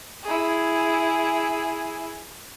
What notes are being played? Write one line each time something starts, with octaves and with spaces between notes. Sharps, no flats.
E4 G#4